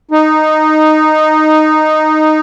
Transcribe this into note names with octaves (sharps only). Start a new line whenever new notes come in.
D#4